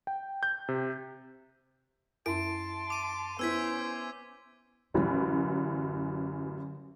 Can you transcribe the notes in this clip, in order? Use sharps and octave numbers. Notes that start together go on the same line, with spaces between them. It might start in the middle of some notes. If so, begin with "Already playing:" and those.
G5
G6
C3
F#2 E4 A5 C6 D7
D6 D#7
B3 C#4 E4 C5 E6 G#6 B6
A1 F#2 D3 E3 F#3